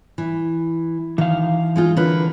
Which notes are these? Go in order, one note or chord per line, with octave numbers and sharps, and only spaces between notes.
E3
D#3 E3 F5
G#3 D#4 F4
D3 A#4 B4